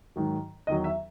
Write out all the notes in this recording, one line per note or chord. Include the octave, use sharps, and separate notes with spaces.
G#2 D#3 F#3
E2 D#3 F#3 D#5
E5